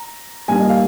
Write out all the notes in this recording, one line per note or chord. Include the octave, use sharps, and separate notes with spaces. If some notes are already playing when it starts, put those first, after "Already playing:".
Already playing: A#5
G2 D#3 G3 A#3 G#5
D#5
F5